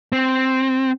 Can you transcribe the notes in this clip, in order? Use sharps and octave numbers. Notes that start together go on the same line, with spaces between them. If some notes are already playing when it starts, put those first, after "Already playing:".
C4